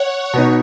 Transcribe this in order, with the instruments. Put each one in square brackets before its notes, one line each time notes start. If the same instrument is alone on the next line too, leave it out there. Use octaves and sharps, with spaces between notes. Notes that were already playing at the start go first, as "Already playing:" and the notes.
Already playing: [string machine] C#5 F#5
[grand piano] B2 B3 D#4